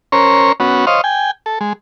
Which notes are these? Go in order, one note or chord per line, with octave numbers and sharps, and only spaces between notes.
C#4 A#4 C5 C#5
B3 C#4 F#4
C5 C#5 D#5 F5
G5 G#5
A4
G#3